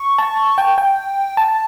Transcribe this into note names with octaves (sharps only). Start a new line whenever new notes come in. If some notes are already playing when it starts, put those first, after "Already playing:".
Already playing: C#6
A5
G5
G5
A5